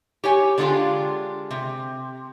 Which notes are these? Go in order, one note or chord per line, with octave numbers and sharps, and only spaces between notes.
G4 C#5 G#5
D3 G#3 D4 E4 F4 G4
C3